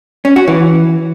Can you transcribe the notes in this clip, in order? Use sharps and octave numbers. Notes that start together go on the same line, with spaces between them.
C#4
F#4
E3